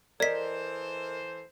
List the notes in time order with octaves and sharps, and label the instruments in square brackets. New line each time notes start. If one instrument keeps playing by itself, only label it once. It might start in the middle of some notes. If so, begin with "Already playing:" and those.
[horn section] E3 A4 C5 [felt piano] A#4 D#5 [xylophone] D5 B6